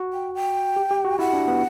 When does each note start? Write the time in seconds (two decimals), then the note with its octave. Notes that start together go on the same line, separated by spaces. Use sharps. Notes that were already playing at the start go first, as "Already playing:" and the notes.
Already playing: F#4
0.13 G5
0.35 G5
0.76 G4
0.91 G4
1.05 F#4
1.19 E4 F#5
1.33 D4
1.48 B3